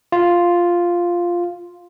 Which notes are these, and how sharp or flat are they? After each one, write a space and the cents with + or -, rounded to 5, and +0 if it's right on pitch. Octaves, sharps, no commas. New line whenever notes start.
F4 +0